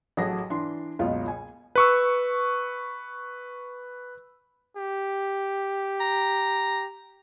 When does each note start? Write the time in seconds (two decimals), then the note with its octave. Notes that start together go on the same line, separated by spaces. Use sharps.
0.17 A1 F#3 A3 G#4 A#6
0.50 E3 D4 C6
0.99 F#1 C#2 B2 F4 D#5
1.28 G#5
1.76 B4 C#6 E6
4.77 G4
6.00 A#5